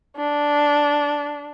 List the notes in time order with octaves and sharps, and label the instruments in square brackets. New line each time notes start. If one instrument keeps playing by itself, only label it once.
[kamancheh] D4